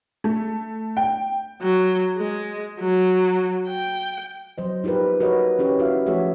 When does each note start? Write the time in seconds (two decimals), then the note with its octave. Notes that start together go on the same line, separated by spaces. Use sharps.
0.24 A3
0.97 G5
1.61 F#3
2.17 G#3
2.79 F#3
3.68 G5
4.58 F#3 C5 D#5
4.84 D#4 F4 G4 A#4 B4
5.20 D#4 F#4 A#4 B4 C#5 D#5
5.59 C#4 E4 G4 B4 C#5
5.80 E4 F#4 E5 F5
6.06 F3 A3 F#4 G#4 C#5 E5